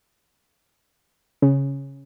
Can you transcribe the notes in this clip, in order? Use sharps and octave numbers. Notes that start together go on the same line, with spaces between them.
C#3